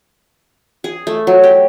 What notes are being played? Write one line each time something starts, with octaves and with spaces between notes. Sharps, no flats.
G#4
A3
F#3
G4